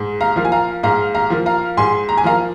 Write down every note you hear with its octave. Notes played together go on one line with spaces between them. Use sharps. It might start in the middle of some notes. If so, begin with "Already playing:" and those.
Already playing: G#2
F5 A#5
F3 A#3 F5
G#5
F5 A#5
G#2 F5 A#5
F5 A#5
F3 A#3
F5 A#5
G#2 G#5 C6
A#5
G#5
F3 A#3 F5 A#5